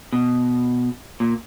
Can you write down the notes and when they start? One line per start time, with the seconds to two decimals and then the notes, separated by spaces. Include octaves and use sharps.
0.13 B2
1.20 A#2